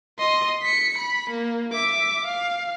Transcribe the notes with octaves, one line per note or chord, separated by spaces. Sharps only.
D#5 C6
B6 C#7
B5
A#3
E5 D6
F5